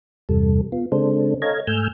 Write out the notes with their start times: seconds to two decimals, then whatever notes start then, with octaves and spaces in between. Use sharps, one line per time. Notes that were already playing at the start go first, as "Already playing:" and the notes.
0.29 E2 G2 C3 G3 A4
0.72 B3 F4
0.92 C#3 G#3 C4 D4 A4 C5
1.42 A4 C#5 D#5 F5 A#5 G#6
1.67 G#2 A3 G#5 E6 F6 G6